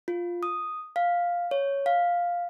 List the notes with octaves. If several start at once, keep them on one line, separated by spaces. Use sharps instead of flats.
F4
D#6
F5
C#5
F5